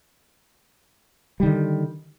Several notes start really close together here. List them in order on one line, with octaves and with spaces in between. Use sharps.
G3 D#3 D3